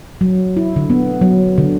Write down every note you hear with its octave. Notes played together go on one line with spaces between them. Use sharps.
F#3
E4
D3
B3
F#3
D3